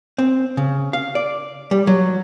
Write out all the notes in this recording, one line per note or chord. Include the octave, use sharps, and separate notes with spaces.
C4
C#3
F5
D5
G3
F#3